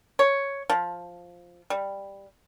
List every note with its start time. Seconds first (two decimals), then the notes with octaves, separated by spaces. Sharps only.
0.19 C#5
0.70 F3
1.70 G3